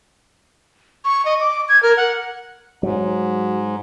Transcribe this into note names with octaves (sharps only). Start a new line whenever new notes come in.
C#6
D#5
D6
G#6
A#4
F#5
G#2 F#3